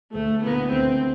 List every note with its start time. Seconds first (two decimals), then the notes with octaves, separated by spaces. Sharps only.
0.14 D2 A3
0.43 D3 A3 B3 E4
0.72 D2 C4